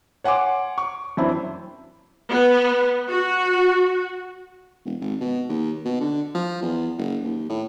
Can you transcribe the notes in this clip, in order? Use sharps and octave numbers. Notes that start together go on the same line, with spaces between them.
C#5 F#5 G#5 C6 D6
C#6
F#2 E3 C4 D4 E4
B3
F#4
E1
G#1
B2
D#2
B2
D3
F3
E2
F#1
D#2
A2